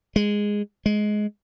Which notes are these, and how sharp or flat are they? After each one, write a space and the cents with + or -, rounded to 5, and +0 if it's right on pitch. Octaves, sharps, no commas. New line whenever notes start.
G#3 -10
G#3 +15